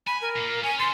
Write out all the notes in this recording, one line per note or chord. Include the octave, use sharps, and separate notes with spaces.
G#5 B5
A#4
A#2 A#3
C#4 G#5
D4 A4 C6